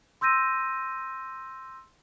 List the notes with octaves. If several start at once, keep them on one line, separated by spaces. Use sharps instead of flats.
C6 E6 G6 A#6 D#7